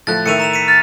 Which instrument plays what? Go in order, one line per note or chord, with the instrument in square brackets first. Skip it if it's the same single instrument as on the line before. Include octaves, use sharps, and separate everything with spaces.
[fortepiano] A2 F3 A3 [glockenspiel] F#6 A6
[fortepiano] A2 D#3 E5 [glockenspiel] C#7 D#7 F7
[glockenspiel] A#5 E7 F7
B6 C#7 D#7
[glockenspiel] F6 [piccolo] A6